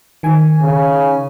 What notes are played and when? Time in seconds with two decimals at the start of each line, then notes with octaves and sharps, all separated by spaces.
0.23 D#3 G#5
0.61 C#3